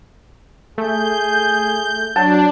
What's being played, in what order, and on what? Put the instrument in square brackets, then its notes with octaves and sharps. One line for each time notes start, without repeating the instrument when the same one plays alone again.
[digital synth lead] A3 [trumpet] G#4 [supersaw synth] G6
[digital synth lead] F#3 [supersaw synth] D4 [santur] A5